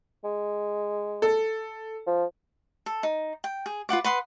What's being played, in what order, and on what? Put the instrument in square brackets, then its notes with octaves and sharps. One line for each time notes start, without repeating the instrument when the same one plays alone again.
[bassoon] G#3
[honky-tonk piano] A4
[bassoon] F3
[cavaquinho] A4
D#4
G5
G#4
F4 B4 F#5 D6
B4 F#5 C6 D#6